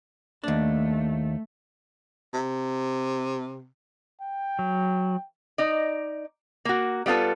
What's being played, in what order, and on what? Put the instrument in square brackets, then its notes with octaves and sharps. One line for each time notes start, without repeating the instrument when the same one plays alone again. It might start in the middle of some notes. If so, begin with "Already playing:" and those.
[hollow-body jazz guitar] D#2 D4 [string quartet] A3
[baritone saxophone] C3
[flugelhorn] G5
[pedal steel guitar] F#3
[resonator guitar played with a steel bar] D#4 D5
A#3 F#4
G3 B3 F4 A4 B4